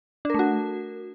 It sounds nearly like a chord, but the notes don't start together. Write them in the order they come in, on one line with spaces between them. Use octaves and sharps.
D4 A#4 A3 F#4